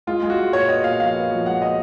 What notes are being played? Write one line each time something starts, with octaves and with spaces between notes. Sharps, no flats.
G#3 F4
G#3
F#4
G#3
A#2 C#5
B3 D#5
A#2 F5
F3 F5
B3
F3
G#3 F#5
B3 D#5